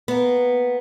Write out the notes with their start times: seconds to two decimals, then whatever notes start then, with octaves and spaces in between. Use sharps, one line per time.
0.08 A#3 B3